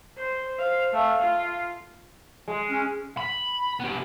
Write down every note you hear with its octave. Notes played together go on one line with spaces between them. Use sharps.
C5
C5 F5
A3 F5
F4
G#3
C#4
B5
B3 G4